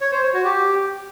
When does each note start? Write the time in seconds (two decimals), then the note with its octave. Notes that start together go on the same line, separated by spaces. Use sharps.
0.01 C#5
0.12 C5
0.23 C#5
0.33 F#4
0.44 G4